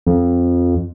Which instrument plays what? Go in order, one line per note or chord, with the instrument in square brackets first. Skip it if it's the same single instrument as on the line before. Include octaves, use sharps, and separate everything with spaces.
[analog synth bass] F2